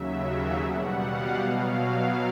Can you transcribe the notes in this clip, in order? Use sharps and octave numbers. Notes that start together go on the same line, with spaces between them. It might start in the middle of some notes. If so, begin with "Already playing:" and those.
Already playing: D#2 C#3 F#3 E5
E5
B2 G3 F#5
F5
B2 F#3 F5
F5